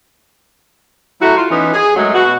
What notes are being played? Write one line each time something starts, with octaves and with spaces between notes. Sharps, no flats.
F#3 A3 E4 F#4
F4
E3 B3 C#4 D#4
G#4
F#2 F#3 G#3 A3
B2 F#4